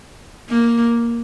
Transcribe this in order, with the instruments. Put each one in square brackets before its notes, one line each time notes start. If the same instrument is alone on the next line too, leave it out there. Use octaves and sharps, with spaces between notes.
[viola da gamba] A#3